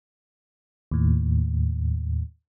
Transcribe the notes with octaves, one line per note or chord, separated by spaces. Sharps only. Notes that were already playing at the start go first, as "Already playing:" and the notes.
D#2 A2